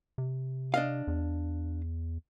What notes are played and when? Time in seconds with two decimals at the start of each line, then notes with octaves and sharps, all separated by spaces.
0.18 C3
0.74 D4 D#5 F5
1.07 E2